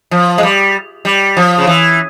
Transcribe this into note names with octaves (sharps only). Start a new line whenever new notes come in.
F3
G#3
G3
G3
F3
C#3
E3